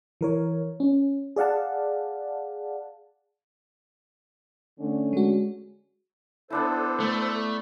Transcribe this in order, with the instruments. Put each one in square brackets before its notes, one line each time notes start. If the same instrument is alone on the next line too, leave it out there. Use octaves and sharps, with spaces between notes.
[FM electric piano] E3 A#4 C#5
C#4
G#4 D5 F5 F#5 A5
[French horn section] D3 A3 C#4
[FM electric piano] G#3 F#4
[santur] B3 D4 E4 [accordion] A4 C5
[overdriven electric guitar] A3